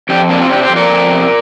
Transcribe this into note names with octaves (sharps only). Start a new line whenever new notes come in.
F2 D4 G4
C3 A#3 D4
C4 F4
C3 D4 G4
G4 C5
F2
A#4 D5
F2
C3